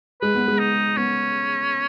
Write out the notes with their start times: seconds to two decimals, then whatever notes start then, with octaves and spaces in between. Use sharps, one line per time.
0.21 G#3 B4
0.35 B3
0.48 G#3
0.59 D#4
0.97 B3 C#4